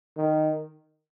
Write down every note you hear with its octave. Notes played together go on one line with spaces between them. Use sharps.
D#3